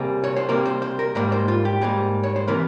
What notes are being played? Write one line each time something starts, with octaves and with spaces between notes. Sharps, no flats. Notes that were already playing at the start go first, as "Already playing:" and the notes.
Already playing: C3 G3 A#3 G#4
C#5
C5
C3 G3 A#3 A#4
C5
C5
A#4
G#2 G3 A#3 A#4
C5
F4
G4
G#2 G3 A#3 G#4
C#5
C5
C3 E3 A#3 A#4